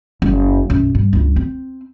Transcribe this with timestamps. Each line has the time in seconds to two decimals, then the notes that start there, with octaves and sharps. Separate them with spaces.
0.22 F#1
0.70 B1 F#2
0.95 G2
1.13 C#2 G2
1.36 C4